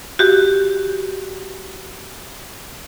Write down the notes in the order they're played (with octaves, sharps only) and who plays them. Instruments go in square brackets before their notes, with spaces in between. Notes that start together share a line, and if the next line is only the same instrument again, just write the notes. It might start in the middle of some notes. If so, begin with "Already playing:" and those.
[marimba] F#4 G4